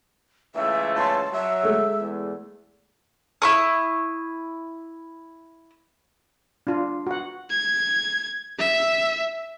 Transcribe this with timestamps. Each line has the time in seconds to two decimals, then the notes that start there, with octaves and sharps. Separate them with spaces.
0.55 C#2 E3 A3 E5
0.96 C#5 A5 C6
1.33 F#3 E5
1.63 G#3 A3
1.98 E2
3.42 E4 C#6 D#6
6.67 D4 F4
7.07 F#4 F#5
7.50 G#6
8.59 E5